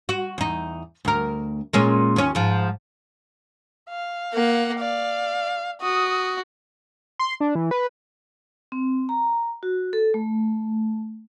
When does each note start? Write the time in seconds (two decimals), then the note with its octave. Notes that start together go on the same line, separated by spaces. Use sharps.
0.09 F#4
0.38 E2 D#4
1.05 D2 A#4
1.73 A#2 G#3 C#4
2.16 D#2 C#4
2.35 G#2 F3
3.89 F5
4.34 A#3 F#5
4.79 D5 F5
5.81 F#4 D#6
7.19 C6
7.41 D4
7.55 E3
7.71 B4
8.72 C4
9.09 A#5
9.63 F#4
9.93 A4
10.14 A3